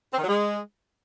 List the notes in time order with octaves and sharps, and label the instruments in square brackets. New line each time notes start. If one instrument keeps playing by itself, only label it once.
[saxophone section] C4
D#3
F#3
G#3